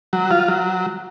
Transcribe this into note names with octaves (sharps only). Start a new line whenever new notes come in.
F#3
F4
F#3